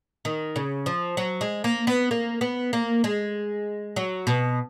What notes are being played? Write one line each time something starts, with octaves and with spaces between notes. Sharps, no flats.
D#3
C#3
F3
F#3
G#3
A#3
B3
A#3
B3
A#3
G#3
F#3
B2